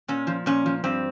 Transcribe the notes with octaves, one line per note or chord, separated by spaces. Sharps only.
A#2 C#4
F3
A#2 C#4
F3
G2 C4